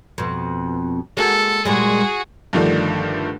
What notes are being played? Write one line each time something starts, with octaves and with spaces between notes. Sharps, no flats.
F2 B2
G#3 A#3 F#4 A4
A#2 G3 G#3 F#4 G#4
G2 D3 D#3 F3 A3 D4